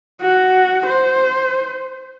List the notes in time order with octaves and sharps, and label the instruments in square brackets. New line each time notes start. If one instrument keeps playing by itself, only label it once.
[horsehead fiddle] F#4
C5